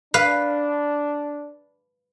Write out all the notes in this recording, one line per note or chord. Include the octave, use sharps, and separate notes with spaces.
D4 B4 F5